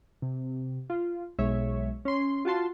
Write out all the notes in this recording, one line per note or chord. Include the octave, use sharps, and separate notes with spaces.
C3
F4
B1 G#3 C#5 E5
C#4 C6
F4 F#4 A5 C6